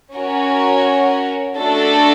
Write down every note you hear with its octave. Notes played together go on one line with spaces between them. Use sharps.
C#4 F#4 A#4 C#5
A3 D4 F#4 A4